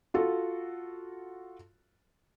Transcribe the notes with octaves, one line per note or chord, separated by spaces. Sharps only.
F4 F#4 A4